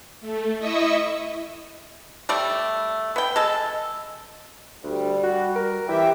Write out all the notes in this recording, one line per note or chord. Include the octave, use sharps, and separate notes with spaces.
A3
E4 D#5 E5 C#6 D#6 E6
G3 A3 D5
B3 G5
G#3 A4
D2 G3
F#4
A#4
E3 G4 E5 G5